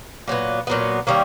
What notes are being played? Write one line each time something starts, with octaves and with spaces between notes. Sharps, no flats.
A#2 F#3 B3
A#2 F#3 B3
D#3 G3 A#3 C#4